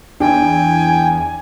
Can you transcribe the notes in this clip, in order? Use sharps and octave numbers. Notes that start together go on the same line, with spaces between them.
E2 D4 G5 G#5